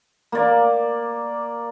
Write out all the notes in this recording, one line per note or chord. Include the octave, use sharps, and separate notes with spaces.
A#3 D5